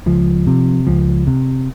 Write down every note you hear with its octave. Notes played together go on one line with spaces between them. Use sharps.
C#2 F3
C3
C#2 F3
C3